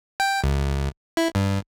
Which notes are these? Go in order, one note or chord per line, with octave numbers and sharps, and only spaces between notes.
G5
C#2
E4
G2